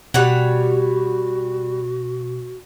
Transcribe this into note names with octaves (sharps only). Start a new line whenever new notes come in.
B2 G3 F#4 C#5 F#5